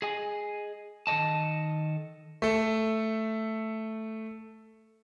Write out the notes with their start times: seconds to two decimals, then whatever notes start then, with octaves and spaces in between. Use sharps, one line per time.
0.02 G#4 D#5 G#5
1.07 D#3 A4 C#5 D#5 A5
2.42 A3 A4